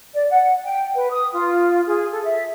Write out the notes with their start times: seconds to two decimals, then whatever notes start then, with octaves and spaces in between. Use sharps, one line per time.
0.14 D5
0.30 F#5
0.64 G5
0.95 B4
1.10 D#6
1.33 F4
1.87 G#4
2.12 A4
2.24 E5